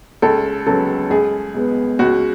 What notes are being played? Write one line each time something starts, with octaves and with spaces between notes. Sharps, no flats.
C#2 A4
C#3 F#3 B3 A4
C#2 G#4
B2 G#3 B3
C#2 F#4